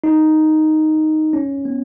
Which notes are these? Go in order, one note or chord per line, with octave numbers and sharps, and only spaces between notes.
D#4
C#4
B3